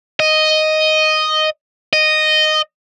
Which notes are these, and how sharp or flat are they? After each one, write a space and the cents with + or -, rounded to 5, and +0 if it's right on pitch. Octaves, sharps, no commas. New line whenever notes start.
D#5 +0
D#5 -10